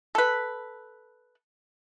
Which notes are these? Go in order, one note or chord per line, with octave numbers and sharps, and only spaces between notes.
A4 B4